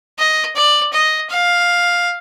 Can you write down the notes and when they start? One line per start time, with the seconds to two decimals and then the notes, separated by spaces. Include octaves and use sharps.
0.18 D#5
0.56 D5
0.93 D#5
1.29 F5